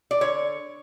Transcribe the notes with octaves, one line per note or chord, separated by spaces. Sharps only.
D5
D3 C#5